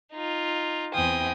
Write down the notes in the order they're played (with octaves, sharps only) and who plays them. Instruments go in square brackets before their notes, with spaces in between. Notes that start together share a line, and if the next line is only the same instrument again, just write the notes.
[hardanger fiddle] D#4 F4
[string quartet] E2 G5 G#5 [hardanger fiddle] C4 D#6